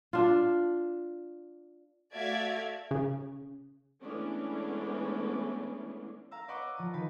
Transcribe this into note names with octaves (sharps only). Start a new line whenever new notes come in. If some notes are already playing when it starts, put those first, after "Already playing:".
D4 F4
A3 F#4 D5 E5 F5 G#6
C#3
E3 G#3 A3 B3 C#4 D4
F5 A#5 E6
B4 D5 D#5 F#5 C#6 D6
F3 A#5 D#7
D#3 B4